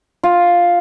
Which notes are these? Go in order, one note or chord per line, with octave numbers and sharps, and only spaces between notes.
F4